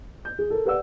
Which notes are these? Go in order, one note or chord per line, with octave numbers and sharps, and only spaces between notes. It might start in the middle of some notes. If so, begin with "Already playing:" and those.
G6
G#4
A4 A#4
G4 B4 D5 F#5 E6